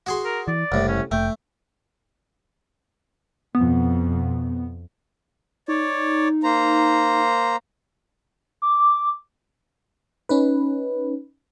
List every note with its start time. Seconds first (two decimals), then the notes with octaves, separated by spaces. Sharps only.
0.06 F#4 G#4 C6
0.25 A#4
0.48 E3 D5
0.72 F#1 C2 A2
0.88 C#4
1.12 F1 A3 G5
3.55 F2 B2 B3
5.68 D#4 C#5 D5
6.44 A#3 C5 A#5
8.62 D6
10.29 C#4 D#4 B4